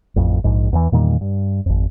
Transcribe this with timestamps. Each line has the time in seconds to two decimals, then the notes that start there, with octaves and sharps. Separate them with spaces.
0.16 A1 F2
0.44 A#1 G#2
0.73 E2 E3
0.92 E2 A#2 D#3 G3
1.21 G2
1.66 G#1 F2